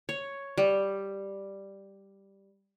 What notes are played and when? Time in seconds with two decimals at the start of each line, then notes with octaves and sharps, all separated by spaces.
0.09 C#5
0.58 G3